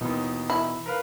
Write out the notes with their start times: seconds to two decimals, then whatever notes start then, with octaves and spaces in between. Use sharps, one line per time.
0.01 D#2 B2 E3 D#4
0.50 E4
0.86 A#4 B4 F5